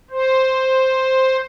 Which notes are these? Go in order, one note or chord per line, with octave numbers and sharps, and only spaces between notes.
C5